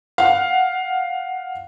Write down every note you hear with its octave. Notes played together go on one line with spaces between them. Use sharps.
F5 F#5